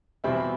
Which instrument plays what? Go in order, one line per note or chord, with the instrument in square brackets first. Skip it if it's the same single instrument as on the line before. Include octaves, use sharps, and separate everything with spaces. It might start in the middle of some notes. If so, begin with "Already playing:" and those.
[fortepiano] E2 B2 G3 C4 E4